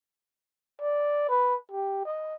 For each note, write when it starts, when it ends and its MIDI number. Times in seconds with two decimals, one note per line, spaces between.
0.82 1.25 74
1.29 1.55 71
1.72 2.02 67
2.05 2.36 75